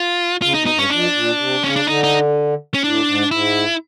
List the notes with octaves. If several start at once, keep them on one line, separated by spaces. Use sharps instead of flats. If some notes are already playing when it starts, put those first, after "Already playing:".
Already playing: F4
C#3 F4
D#4
B2
D#4
G2
C#4
F2 D4
A#2
C3
C#3 C#4
D4
D3 D#4
D#4
C#4
A2 D4
G#2
G#2 E4